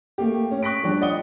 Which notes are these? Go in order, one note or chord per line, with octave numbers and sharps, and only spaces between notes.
A3 A#3 G4
C#4
C#6 F#6 A#6 B6 D7
F3 G3 D4 G4
D5 D#5 F#5 D#6 G7